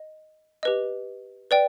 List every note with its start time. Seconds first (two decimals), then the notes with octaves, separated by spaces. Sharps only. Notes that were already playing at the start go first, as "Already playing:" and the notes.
Already playing: D#5
0.63 G4 B4 D#5
1.51 B4 D5 G5